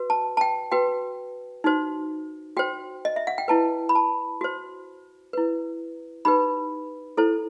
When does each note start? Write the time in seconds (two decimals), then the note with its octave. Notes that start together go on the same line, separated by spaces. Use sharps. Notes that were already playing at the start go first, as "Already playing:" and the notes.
Already playing: F#4 B4
0.10 A5
0.37 A5
0.41 G5
0.72 F#4 B4 G5
1.64 D#4 F#4 C5
2.57 F#4 C5 G5
3.05 D#5
3.16 E5
3.27 F#5
3.38 G5
3.48 E4 B4 A5
3.89 B5
3.95 A5
4.41 F#4 C5
5.33 E4 B4
6.25 D#4 G4 B4 B5
7.17 E4 A4 C5